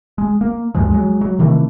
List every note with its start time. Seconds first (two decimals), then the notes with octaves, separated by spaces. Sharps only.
0.18 G#3
0.41 A#3
0.75 D2 G2 F3 G#3
0.91 F#3 G#3
1.21 F#3
1.39 C3 D#3 E3 A3